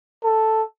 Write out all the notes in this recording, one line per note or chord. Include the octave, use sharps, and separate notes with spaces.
A4